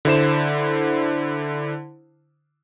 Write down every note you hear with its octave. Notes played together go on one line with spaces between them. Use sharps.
D3 E4 C5 E7